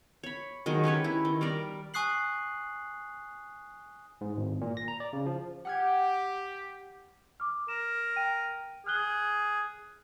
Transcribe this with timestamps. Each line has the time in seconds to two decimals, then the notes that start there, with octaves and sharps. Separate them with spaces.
0.23 C#5 B5
0.66 D#3 F#3 G#3 G#4
0.84 C#4 G4 B4 C#5
1.04 E4
1.25 D#3
1.41 G3 A#4 D5
1.94 G#5 C#6 D#6 F#6 C7 F#7
4.21 G#2
4.37 G#1
4.61 A#2
4.77 A#6
4.88 A#5
5.00 D5
5.13 C#3
5.26 F3
5.65 G4 F#5 F6 G#6
7.40 D6 F6
7.68 A#4 E7
8.16 G5 D#7
8.86 G#4 F6 F#6 G7